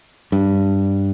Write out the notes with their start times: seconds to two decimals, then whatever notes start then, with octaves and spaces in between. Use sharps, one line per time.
0.32 G2